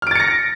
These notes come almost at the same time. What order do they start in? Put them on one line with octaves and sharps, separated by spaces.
F6 D7 A6 C#7 A#6